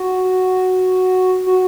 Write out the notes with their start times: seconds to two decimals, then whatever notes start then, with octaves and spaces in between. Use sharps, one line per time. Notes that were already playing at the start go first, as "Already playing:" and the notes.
Already playing: F#4
1.46 F#4